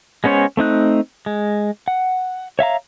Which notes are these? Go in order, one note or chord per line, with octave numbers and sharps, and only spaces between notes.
G#3 B3 C#4 C5 C#5
A3 C4 D#4 F#6
G#3
F#5
C#5 E5 F5 A#5